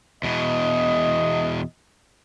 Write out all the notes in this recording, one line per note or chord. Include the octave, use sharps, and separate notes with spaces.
E2 B2 D#5